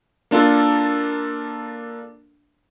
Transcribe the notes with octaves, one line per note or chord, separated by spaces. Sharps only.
A#3 D4 F4 A4